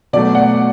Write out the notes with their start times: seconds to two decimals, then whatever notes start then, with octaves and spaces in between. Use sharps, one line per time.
0.13 B2 F#3 A3 D5
0.35 F#5